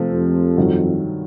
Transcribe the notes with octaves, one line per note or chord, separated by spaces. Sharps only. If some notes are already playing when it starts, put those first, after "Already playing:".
Already playing: C3 F3 A3 C4
F2
G2 D#3 F#3